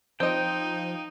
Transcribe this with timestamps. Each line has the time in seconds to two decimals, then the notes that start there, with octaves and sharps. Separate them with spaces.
0.20 F3 C4 D#4 D#5 G5